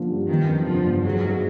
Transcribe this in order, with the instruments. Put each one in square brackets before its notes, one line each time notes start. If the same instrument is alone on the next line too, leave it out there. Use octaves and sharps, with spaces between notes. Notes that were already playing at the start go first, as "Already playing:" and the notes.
Already playing: [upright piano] D3 F3 A#3
G2
[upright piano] G1 [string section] D#3
[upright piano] F2
[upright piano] D3 [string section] F3
[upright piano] G1
[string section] F#3 [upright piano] G#3
[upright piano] G#2